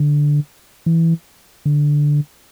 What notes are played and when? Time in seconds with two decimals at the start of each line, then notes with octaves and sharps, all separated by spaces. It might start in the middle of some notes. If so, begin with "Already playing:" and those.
Already playing: D3
0.86 E3
1.66 D3